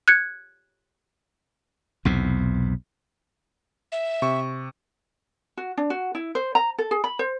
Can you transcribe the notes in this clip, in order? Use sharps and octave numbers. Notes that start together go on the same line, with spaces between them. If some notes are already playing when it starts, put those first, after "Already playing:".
F#6 G#6 C#7
B1 E2 C3
E5
C3 C#6
F#4
D4
F#4
E4
C5
A#5
A4
G#4
B5
C5